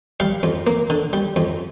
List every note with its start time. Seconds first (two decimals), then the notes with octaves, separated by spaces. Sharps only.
0.20 G3 F5
0.43 F2
0.67 A#3
0.90 D3
1.13 G3
1.36 F2